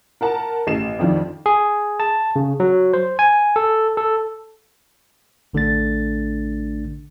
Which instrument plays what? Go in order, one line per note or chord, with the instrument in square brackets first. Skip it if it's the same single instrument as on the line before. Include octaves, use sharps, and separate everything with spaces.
[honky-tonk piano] A#4 F#5 A5 A#5
A1 C7 E7
F2 D#3 F3 D4 F4
[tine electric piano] G#4
A5
C#3
F#3
C5
G#5
A4
A4
A1 D3 A3 D4 A6